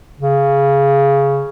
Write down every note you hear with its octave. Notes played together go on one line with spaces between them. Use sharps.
C#3